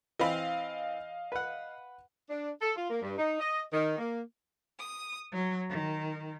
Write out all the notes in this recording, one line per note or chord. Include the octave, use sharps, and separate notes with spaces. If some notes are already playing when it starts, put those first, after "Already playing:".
E3 C4 D#5 F5 B5
B4 F#5
D4
A4
F4
A#3
G2
D#4
D#5
D#3
A#3
D#6
F#3
D#3